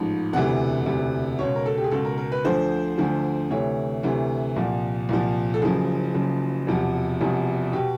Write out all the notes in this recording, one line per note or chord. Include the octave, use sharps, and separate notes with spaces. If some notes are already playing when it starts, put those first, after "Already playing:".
Already playing: A1 G#2 F3
E1 D2 C3 E3 F#5
E1 D2 C3 E3
C#2 B2 C#5
A#4
A4
G4
G#4
C#2 B2 A4
A#4
A#4
B4
D2 D3 F3 C5
D2 D3 F3
D2 C3 E3 C#5
D2 C3 E3
C2 A#2 F3
C2 A#2 F3
A4
F#1 F#2 C#3 F3 G#4
F#1 F#2 C#3 F3
E1 E2 C3 F3
E1 E2 C3 F3
B2 G4